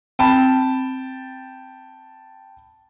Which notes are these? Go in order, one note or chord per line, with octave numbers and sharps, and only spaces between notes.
C4 G5 A5 B5